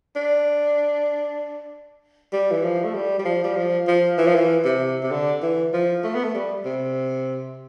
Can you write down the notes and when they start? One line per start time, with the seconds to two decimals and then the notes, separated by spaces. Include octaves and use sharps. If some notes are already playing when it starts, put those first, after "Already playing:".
0.16 D4
2.33 G3
2.51 E3
2.64 F3
2.84 A3
2.94 G3
3.19 G3
3.25 F3
3.44 G3
3.56 F3
3.88 F3
4.18 E3
4.27 F3
4.35 E3
4.65 C3
5.03 C3
5.11 D3
5.42 E3
5.73 F3
6.04 A3
6.15 B3
6.24 A3
6.35 G3
6.65 C3